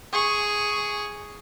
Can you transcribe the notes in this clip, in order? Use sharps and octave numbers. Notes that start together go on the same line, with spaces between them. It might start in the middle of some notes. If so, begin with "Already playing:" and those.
G#4 C#6